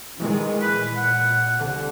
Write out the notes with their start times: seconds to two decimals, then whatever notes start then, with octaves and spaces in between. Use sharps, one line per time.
0.20 D#3 E3 G#3
0.62 A#2 B4
0.96 F#5
1.58 C2 D3